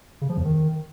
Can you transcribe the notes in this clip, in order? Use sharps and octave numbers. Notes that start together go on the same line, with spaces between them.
C#3
F3
E2
D#3